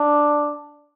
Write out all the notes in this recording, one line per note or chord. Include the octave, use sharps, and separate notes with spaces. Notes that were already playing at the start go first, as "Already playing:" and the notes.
Already playing: D4